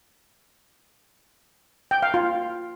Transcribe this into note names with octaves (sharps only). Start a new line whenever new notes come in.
G5
F5
F4